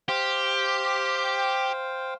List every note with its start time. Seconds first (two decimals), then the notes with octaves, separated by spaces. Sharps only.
0.09 G4 C5 F5 G5